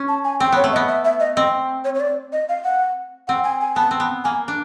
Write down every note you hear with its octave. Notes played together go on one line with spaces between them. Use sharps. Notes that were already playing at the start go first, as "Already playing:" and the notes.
Already playing: C#4
A5
G#5
C4 G5
B3 C#5
A3
D#5
B3
E5
E5
D#5
C4 D#5
C#5
C#5
D5
D#5
F5
F#5
C4 F#5
G#5
G#5
B3 A5
C4
B3
A#3 G#5
D4